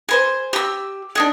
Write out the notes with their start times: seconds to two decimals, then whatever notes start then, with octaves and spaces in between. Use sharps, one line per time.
0.09 G#4 B4 C5
0.53 G4 E6
1.15 D4 D#4 G#4